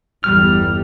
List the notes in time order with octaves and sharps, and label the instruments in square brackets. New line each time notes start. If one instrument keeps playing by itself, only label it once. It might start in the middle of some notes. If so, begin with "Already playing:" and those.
[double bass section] G1 E2 G3 [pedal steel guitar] F6